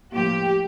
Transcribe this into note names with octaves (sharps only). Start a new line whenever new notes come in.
A2 F3 A#3 G4